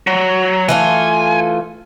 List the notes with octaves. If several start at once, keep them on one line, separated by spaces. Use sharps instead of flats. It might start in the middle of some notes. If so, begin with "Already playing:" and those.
F#3
E3 A3 F4 G#5